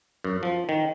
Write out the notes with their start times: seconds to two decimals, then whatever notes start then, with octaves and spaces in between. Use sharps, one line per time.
0.24 F#2
0.43 F3
0.69 D#3